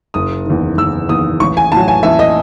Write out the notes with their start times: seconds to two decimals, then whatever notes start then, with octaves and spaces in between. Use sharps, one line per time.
0.14 F#1 D#6
0.46 E2 D#3
0.77 F#1 E6
1.09 E2 D#3 D#6
1.40 A1 C#6
1.57 G#5
1.72 A2 F#3 A5
1.88 G#5
2.03 A1 E5
2.19 D#5